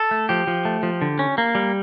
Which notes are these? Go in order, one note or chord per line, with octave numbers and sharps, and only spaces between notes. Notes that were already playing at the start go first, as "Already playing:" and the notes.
Already playing: A4
A3
F3 G4
F3
A3
F3
D3
C#4
A#3
G3